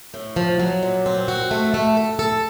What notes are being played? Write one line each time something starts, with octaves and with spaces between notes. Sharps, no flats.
A2
F3
F#3
A#2
C4
F#4
A3
A3
A4
A4